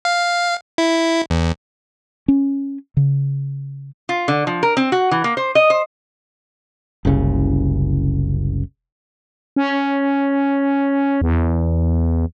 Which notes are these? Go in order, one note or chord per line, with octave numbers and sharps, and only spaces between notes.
F5
E4
E2
C#4
C#3
F4
D3
F3
A#4
C4
F#4
E3
A#3
C5
D#5
C5
F#1 C2 C#3
C#4
E2